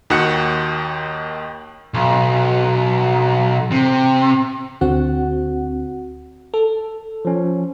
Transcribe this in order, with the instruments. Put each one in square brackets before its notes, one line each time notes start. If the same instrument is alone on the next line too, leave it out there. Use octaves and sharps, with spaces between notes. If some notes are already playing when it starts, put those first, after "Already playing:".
[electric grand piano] D#2 D#3 F#4 F#6 C#7
[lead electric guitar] B1
C3
[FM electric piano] D2 D3 C4 F#4 F#5
A4
[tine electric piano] F3 C#4